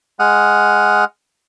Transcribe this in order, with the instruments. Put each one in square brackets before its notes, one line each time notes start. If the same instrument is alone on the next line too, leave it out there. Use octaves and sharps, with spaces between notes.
[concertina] G#3 F#5 D#6 F6